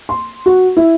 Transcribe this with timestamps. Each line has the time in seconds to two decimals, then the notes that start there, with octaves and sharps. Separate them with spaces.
0.09 C6
0.46 F#4
0.77 E4